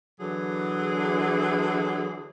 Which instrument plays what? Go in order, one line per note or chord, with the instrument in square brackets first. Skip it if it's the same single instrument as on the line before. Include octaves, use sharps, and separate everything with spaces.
[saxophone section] D3 E3 F#3 G#4